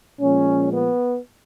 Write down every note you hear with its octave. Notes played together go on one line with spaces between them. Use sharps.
A#2 F3 G#3 C#4
B3